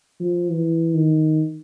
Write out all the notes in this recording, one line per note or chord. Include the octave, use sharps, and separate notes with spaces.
F3
E3
D#3